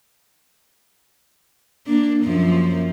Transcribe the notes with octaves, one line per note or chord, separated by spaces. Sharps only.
A#3 D4
F#2 F3 A#3